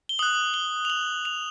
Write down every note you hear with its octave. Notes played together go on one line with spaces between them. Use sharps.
G7
D#6 F#6 F#7
G7
F7
F#7
F7